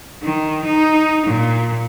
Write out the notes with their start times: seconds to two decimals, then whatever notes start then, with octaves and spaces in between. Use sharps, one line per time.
0.23 D#3
0.64 D#4
1.26 A#2